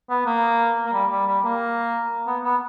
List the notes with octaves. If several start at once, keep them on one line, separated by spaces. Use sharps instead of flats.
B3
A#3
A#3
G3
G3
G3
A#3
B3
B3